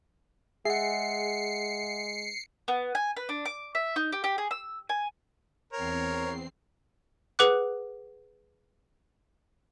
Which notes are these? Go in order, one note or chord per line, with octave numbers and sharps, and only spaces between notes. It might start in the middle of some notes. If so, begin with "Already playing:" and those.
G#3 G#4 E5 F#5 C7 C#7
B3
G#5
B4
D4
D6
E5
D#4
G4
G4
G#4
E6
G#5
E2 C4 A#4 C#5 C7
G#4 B4 F#5 D6 F#6